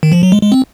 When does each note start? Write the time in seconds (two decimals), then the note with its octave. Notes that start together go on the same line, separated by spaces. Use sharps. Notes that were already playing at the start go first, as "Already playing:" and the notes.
0.03 D#3
0.12 F3
0.23 F#3
0.32 G#3
0.43 G#3
0.52 C4